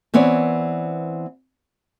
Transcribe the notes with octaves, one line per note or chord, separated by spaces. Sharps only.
E3 B3 C4 C#5 D5